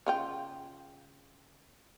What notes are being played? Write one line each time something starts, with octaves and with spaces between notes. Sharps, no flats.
C#3 F4 G5